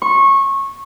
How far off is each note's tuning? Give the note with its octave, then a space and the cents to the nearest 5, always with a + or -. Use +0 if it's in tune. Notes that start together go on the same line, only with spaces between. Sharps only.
C#6 -20